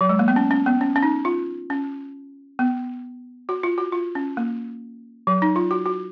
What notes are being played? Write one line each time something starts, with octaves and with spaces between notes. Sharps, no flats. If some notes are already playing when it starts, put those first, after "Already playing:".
F#3
G#3
A#3
B3
C#4
C#4
B3
C#4
C#4
D#4
F4
C#4
B3
F#4
F4
F#4
F4
C#4
A#3
F#3
D#4
F4
F#4
F#4